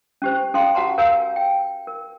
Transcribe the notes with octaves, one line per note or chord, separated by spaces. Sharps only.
C#4 G4 C5
C#4 A4 F5 G5 C6
F#4 G4 F#5 A5 A#5 C6
A#4 C#5 F5 G#5 A#5 E6
G5
A#4